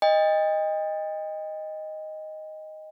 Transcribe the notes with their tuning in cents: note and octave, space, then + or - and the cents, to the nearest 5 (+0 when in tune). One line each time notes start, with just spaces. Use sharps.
D#5 +0 G5 +40